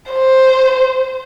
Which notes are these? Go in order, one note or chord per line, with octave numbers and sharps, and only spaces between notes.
C5